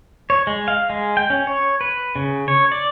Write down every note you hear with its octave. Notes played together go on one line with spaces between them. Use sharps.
C#5
G#3
F5
G#3
G5
C#4
C#5
B4
C#3
C#5
D5